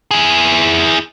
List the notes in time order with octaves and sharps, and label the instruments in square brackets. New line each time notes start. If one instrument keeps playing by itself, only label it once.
[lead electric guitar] E4 G#4